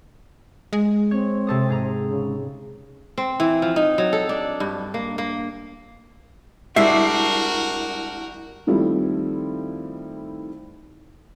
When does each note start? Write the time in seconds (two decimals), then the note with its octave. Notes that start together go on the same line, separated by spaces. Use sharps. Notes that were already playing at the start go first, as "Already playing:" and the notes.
0.73 G#3
1.11 C4 C#5
1.47 C3 A4 D#6
1.69 G#2 G#4 A#5
2.08 C#3
3.18 C4
3.40 E3
3.62 F3
3.76 D#4
3.98 F#3
4.13 A4
4.29 D4
4.60 G2
4.94 A#3
5.18 A#3
6.76 C2 G3 G#3 D4 F#4 A#4 E5 C7
8.67 D#3 F3 G3 A3 C4 E4